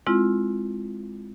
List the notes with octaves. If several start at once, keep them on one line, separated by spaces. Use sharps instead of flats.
G#3 C4 E4 F4